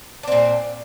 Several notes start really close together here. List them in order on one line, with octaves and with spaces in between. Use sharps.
D4 C4 A#2